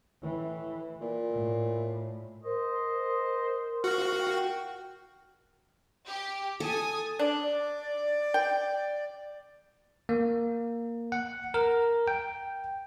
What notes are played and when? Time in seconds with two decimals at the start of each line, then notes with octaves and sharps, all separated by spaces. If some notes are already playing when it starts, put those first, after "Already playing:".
0.23 A2 E3
1.02 A#2
1.31 A2
2.44 A#4 C5 D#5
3.84 F#4 F5
4.19 G5
6.06 G4
6.60 A4 G#5 D#6
7.19 D4 D5
8.34 G5
10.09 A#3
11.12 F#5
11.54 A#4
12.08 G5